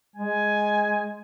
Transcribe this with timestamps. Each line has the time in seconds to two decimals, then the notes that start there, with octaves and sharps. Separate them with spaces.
0.16 G#3 G#5